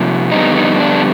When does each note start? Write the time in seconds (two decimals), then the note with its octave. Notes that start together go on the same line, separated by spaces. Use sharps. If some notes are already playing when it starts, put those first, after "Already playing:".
Already playing: C3 F3 A#3
0.31 F2 D3 G3 B3 D#4
0.56 D#4
0.80 D4